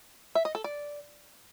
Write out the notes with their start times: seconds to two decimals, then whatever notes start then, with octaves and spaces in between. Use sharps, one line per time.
0.35 E5
0.45 D#5
0.55 A4
0.64 D5